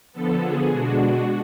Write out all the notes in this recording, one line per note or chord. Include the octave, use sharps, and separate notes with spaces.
D3 F3 B3 A4
G#4
B2 G#3 D4 F#4